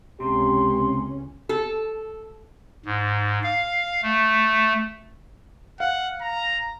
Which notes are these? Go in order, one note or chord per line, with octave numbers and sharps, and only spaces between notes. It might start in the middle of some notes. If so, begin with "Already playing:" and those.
C#2 C3 C#4 G4 C6
A4
G#2
F5
A3
F5 F#5
A#5